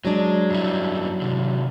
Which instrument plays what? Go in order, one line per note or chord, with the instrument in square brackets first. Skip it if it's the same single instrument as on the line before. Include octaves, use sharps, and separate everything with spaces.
[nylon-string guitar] F#3 D4 [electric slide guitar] G#3
[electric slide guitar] F#2 G3 E4
C3 D#3